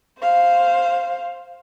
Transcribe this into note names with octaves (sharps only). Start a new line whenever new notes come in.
C5 F5